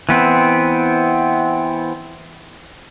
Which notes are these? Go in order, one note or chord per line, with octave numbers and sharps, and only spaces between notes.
E3 B3 C4